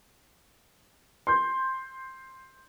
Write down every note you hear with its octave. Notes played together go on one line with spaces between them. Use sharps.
C6 G6